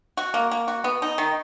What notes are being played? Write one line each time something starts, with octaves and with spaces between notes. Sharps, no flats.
F#4
A#3
A#3
F#4
B3
D#4
D#3